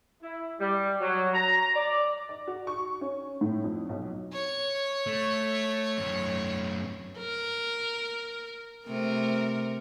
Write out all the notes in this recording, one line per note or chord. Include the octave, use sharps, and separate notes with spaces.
E4
G3
F#3
A#5
D5
D5
F#4
C#6
C#4
A2
F2
B1
C#5
A3
F#2 A3
A#4
C3 A3 A#4